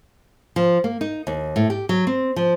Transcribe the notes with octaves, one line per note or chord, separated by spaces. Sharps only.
F3
A#3
D#4
D#2
A2
G4
F#3
C4
F3